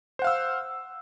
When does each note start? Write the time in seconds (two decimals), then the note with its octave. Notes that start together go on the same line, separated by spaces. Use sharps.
0.19 C5
0.22 F#5
0.24 F5
0.27 E6